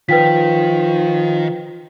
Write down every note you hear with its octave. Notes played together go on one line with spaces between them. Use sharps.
D#3 F3 B4 G5 B6